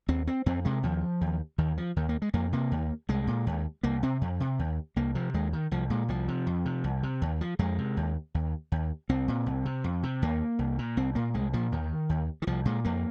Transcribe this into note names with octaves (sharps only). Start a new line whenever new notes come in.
D#2 C4
C4
F2 C4
C3 G#3
D#2 F3
D#2
D#2 D#3
F3
D#2 D#3
A#3
G#3
F2 A#3
C3 A#3
D#2
C2 G#3
A#2
D#2
C2 A#3
C3 C4
F2
C3
D#2
C2 A#3
C3 F3
D#2 G#3
D#3
C2 F3
A#2 G#3
C2 F3
C3
F2
C3
C2
C3
D#2
F3
F2 G#3
C3
D#2
D#2
D#2
C2 C4
A#2
C2
C3
F2
C3
D#2 A#3
C2
A#2
C2 C4
A#2 A#3
C2 G#3
A#2 F3
D#2 D#3
D#2
D#3
C2 F3
A#2 G#3
F2 A#3